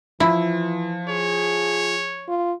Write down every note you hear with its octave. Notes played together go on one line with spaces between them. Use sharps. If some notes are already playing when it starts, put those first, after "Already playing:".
E3 F3 E4
G#4 C#5
F4